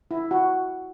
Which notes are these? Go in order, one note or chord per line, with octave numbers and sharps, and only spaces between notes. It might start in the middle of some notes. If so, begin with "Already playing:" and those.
E4
F#4